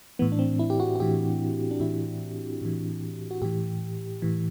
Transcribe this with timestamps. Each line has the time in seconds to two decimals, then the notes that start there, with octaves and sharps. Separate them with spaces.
0.19 A2 E3 B3
0.32 D4
0.39 C4
0.59 E4
0.70 G4
0.80 F#4
0.96 F#4
1.00 A2 E3 G4
1.71 D4
1.80 A2 E3 E4
2.62 A2 E3
3.31 F#4
3.42 A2 E3 G4
4.22 A2 E3